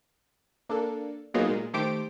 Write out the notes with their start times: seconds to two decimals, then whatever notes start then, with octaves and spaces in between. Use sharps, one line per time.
0.69 A#3 D4 A4
1.34 F#3 A#3 B3 D#4 F4 G#4
1.47 A#2 G#3
1.74 D#3 A3 G4 C5 D6 D7